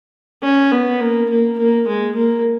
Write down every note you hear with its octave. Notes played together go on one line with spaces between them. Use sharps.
C#4
B3
A#3
A#3
A#3
G#3
A#3